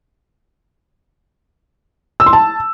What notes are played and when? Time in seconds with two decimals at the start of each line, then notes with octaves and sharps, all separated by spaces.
2.20 E6
2.26 C6
2.33 A5